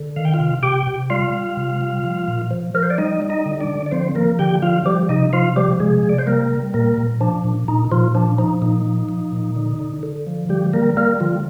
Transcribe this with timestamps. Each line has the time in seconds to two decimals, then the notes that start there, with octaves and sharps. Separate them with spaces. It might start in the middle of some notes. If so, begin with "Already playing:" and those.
Already playing: D3
0.16 D#3 F5
0.25 G5
0.34 F4 F5
0.40 C3
0.63 C3 G4 G5
0.87 C3
1.10 G3 F4 F5
1.34 G3
1.57 C3
1.81 G3
2.04 F3
2.28 A#2
2.51 F3
2.74 F3 A#4
2.83 C5
2.90 D5
2.98 G3 D#4 D#5
3.22 G3
3.29 D#4 D#5
3.46 D3
3.60 D4 D5
3.68 D3
3.86 D5
3.91 F3 C4 C5
4.15 F3 A#3 A#4
4.39 D3 G4 G5
4.62 F3 F4 F5
4.86 F3 G3 G4
5.09 C3 D#4 D#5
5.33 F3 F4 F5
5.56 F3 G3 G4
5.80 C3 G#3 G#4
6.03 C3
6.09 D5
6.18 C5
6.27 G3 A#3 A#4
6.50 G3
6.74 A#2 A#3 A#4
6.97 A#2
7.21 F3 D4
7.44 A#2
7.68 A#2 D#4
7.91 A#2 F3 F4
8.15 F3 D4
8.38 F3 D#4
8.62 A#2 D#4
8.86 F3
9.09 F3
9.32 A#2
9.56 D3
9.79 D3
10.03 D3
10.27 F3
10.49 D3 G3 G4
10.73 G3 A#3 A#4
10.97 G3 A#3 A#4
11.20 D3 F3 F4